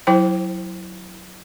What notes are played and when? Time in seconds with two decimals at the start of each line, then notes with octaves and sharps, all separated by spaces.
0.07 F#3 E4 C5 G5